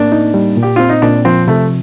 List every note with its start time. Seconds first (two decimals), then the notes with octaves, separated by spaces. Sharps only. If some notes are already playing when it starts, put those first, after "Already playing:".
Already playing: A2 A#3 D4
0.12 D#4
0.34 G3
0.57 A#2
0.63 G4
0.76 C4 F4
0.89 D#4
1.02 A#2 D4
1.25 F3 C4
1.48 C3 A3